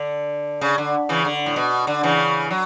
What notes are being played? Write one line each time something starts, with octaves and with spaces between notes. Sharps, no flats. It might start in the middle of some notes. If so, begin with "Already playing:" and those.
Already playing: D3
C#3
D3
C#3 E3
D3
A2
B2
D3
C#3 E3
F#3